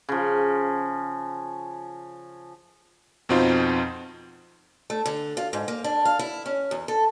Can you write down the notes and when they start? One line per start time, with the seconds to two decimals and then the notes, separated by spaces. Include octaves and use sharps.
0.09 C#3 F3
3.29 F2 B2 C4 D#4 F4 C5
4.90 A3
5.06 D3
5.37 F4
5.53 G#2
5.68 A#3
5.84 D4
6.05 F5
6.19 E4
6.46 C#4
6.71 E2
6.88 A4